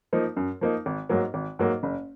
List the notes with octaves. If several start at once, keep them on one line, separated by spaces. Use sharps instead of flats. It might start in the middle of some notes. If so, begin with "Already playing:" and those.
F3 A#3 D#4
F#2
F3 A#3 D#4
G#1
G#2 F#3 A#3
G#1
G#2 F#3 A#3
F#1